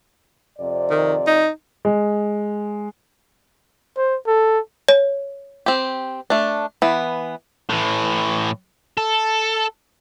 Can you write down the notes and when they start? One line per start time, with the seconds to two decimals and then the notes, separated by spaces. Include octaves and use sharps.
0.57 F2 C3 D5
0.90 D#3
1.27 D#4
1.85 G#3
3.97 C5
4.27 A4
4.89 C#5
5.66 C4 G4
6.30 A3 D4
6.82 E3 B3
7.70 A2 E3
8.98 A4